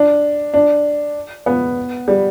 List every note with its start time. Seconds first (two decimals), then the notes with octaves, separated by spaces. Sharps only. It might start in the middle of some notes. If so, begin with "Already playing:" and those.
Already playing: D4
0.54 D4
1.46 B3
2.08 G3